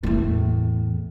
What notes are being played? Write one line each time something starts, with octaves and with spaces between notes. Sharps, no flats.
E2 A2